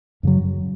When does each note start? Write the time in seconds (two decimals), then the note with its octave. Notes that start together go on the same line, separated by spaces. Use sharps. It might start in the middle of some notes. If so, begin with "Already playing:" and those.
0.23 F#2 C#3 F#3